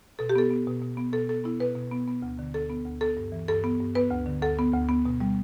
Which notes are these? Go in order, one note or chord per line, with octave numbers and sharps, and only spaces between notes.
B2 A4
G4
B3 A4
B3
B2
B2
B3
B2 A4
B3 A4
B3 E4
B2 B4
B2
B3
B3
D2
D3
D2 A4
B3
D2
B3 A4
G2
E3
G2 A4
B3
G2
B3 B4
D2
D3
D2 A4
B3
D2
B3
B2
G3